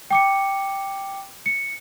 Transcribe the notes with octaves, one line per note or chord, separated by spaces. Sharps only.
G5 D6 C#7
C#7